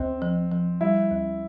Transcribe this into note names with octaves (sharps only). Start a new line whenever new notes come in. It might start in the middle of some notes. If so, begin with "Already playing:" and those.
Already playing: D2 C4
F3
F3
G3 E4
D2